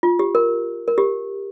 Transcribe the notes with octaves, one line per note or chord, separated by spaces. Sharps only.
F4
G4
A#4
A#4
G4